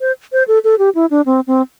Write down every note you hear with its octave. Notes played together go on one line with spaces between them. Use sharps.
C5
C5
A4
A4
G4
E4
D4
C4
C4